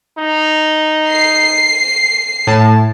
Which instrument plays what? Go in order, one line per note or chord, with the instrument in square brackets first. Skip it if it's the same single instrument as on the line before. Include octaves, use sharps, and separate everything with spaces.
[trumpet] D#4
[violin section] C7
[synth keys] A2 [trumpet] A5